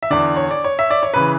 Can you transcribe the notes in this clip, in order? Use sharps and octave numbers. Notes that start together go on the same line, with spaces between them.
E5
E2 D3 D5
C#5
D5
C#5
E5
D5
C#5
C#3 E3 B4